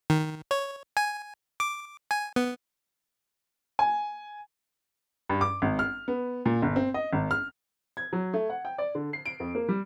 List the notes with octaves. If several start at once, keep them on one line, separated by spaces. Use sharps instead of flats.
D#3
C#5
G#5
D6
G#5
B3
G#5
G2
D6
G#1
F6
B3
A#2
G1
C4
D#5
G#1
F6
G#6
F#3
A3
F#5
G5
D5
D3
C7
D7
F2
A#3
G3